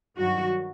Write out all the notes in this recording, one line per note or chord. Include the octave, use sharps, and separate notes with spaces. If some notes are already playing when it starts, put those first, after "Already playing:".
G2 D#3 F#3 F#4